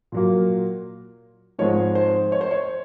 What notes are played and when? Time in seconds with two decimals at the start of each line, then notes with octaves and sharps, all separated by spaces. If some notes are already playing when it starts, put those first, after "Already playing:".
0.12 A#2 F#3 A#3
1.58 G#2 F3 G#3 C4 C#5
1.95 C5
2.32 C#5
2.41 C5
2.51 C#5